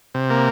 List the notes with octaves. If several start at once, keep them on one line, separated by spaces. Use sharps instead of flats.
C3
A#3